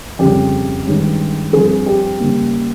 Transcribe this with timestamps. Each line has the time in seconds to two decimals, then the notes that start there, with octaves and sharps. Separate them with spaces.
0.19 F2 C#3 G3 G4
0.86 G2 D#3 G#3 C#4
1.53 G2 F3 C4 G#4
1.86 G4
2.20 C#3 G3 A#3